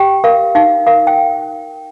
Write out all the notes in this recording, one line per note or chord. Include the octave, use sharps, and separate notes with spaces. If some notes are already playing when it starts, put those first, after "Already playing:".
Already playing: G4 G5
A#4 F5
D#4 F5
A#4 F5
G5